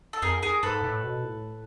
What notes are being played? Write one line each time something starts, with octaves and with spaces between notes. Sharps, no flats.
A4
F2 G#4 A#4
G#4 A#4
G#2 A4 B4
A2
B2
A2